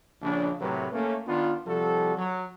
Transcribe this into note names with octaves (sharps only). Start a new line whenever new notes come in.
A#1 C#3 D4
A2 C3 F#3 A3 A#4 B4
A3 A#3 C#4
D#3 B3 D4 F4
C3 F3 G3 F#4 A4
F#3